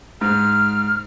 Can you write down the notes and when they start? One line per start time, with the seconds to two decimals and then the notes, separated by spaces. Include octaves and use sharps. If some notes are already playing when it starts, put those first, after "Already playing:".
0.21 G#2 F6